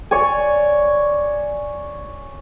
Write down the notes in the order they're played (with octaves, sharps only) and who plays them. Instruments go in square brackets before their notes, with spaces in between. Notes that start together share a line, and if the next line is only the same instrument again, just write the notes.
[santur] C#5 D5 G#5